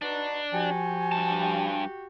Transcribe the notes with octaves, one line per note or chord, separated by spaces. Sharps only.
D4 D#4 F#4 B4
F3 F#4 G4 G#5
G2 A5